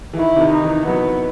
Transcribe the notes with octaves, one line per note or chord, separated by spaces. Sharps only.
E3
D#3 E4
C3
D#3
D#4
E3
F#3 B3